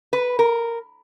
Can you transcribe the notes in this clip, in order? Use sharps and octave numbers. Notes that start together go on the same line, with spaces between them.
B4
A#4